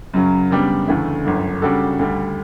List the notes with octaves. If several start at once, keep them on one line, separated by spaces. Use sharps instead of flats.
F#2 C#3 F#3
C#3 G3 B3 D4
D2 C#3 E3 A3 E4
G1 F#2 D3
C#3 G3 D4 F#4 A4
D2 D3 G3